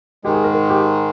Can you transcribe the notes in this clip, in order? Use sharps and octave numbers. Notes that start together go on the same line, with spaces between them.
G#2 D#3 G#3 G4
G#4
A#4
A#4
G4